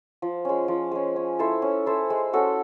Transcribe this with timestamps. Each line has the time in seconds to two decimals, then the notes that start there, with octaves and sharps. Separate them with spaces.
0.22 F3
0.45 G#3 C#4
0.68 F3
0.92 G#3 C#4
1.16 C#4
1.39 E4 A4 C5
1.62 C#4
1.86 E4 A4 C5
2.10 G#3
2.33 C#4 F#4 A4